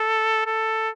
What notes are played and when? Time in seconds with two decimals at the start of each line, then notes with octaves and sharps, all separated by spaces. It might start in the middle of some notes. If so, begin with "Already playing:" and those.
Already playing: A4
0.46 A4